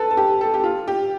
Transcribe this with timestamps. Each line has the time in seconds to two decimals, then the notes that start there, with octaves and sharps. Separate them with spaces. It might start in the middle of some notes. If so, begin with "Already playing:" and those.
Already playing: A4 B4
0.11 A4
0.17 G4
0.41 A4
0.54 G4
0.64 F4
0.88 G4